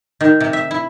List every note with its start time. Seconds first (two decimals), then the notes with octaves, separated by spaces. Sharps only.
0.21 D#3
0.40 C3
0.53 E5
0.71 E4